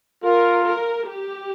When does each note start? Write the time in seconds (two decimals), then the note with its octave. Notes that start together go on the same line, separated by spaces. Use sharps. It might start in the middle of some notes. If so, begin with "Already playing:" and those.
0.24 F4 A#4
0.66 A#4
1.07 G4